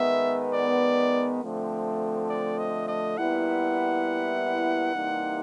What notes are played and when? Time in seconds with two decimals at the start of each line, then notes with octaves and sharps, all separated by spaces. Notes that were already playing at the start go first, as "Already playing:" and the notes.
Already playing: D#3 G#3 B3 E5
0.53 D5
1.41 D3 F3 A3 C4
2.29 D5
2.59 D#5
2.88 D#5
3.17 A#2 G3 B3 E4 F#5
4.93 C3 E3 G3 A#3 D#4